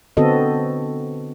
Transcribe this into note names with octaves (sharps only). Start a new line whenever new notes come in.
D3 B3 C4 F#4 A4 D#5